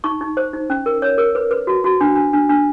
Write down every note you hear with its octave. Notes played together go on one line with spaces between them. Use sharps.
D#4 C#6
D#4
C5
D#4
C#4
A#4
C#5
A#4
B4
B4
F#4
F#4
D4
D4
D4
D4